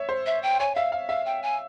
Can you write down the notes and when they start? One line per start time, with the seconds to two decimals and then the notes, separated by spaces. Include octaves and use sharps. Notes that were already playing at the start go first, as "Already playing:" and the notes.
Already playing: C#5 E5
0.09 C5
0.26 E5
0.43 G5
0.60 C#5 G#5
0.75 E5 F5
0.92 F5
1.09 E5 F5
1.25 G5
1.43 G#5